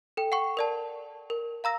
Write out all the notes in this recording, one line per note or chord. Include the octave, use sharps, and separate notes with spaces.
A4 G5
F#5 G5 C#6
A#4 D5 A5
A#4
F5 A#5 E6 A#6